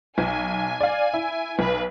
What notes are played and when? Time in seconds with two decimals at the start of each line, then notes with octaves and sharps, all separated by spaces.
0.18 B1 G#5
0.81 D5 F5
1.14 E4
1.59 B1 B4